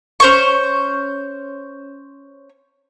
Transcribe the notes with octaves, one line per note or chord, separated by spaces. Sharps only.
C#4 C5 C#6